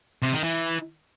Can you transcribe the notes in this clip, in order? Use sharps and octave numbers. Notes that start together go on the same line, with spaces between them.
C3
D#3
E3